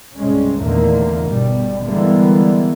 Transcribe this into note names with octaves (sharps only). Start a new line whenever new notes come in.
C2 G2 C3 G3 G#3 C#4
E2 A#2 D3 D#3 A3 A#3
G1 G2 B2 G3
D3 E3 G3 G#3 A#3 B3